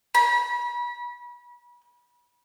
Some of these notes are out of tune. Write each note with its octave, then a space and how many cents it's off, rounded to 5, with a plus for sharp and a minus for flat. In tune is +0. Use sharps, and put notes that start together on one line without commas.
B5 -30